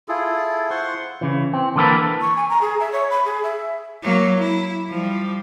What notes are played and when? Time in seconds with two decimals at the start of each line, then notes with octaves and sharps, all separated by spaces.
0.08 E4 F4 G#4 A4
0.70 C5 F#5 C6 C#6
1.21 C#3 E3
1.54 C4
1.76 D3 E3 A#3 B3 A4 B4
2.21 C#6
2.36 G#5
2.49 A#5
2.61 G#4
2.80 E5
2.92 C#5
3.10 B5
3.25 G#4
3.43 E5
4.03 F#3 A#3
4.38 E4
4.90 F3 G3